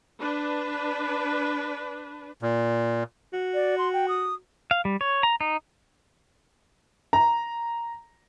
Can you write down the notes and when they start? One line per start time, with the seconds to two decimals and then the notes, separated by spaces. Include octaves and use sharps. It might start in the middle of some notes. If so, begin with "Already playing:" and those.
0.20 D4 B4
2.42 A#2
3.33 F#4
3.54 D5
3.78 C6
3.93 G5
4.08 D#6
4.71 F5
4.85 G3
5.01 C#5
5.23 A#5
5.41 D#4
7.13 A#5